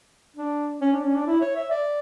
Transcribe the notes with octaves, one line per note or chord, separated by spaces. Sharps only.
D4
C#4
D4
C#4
D4
E4
C#5
E5
D5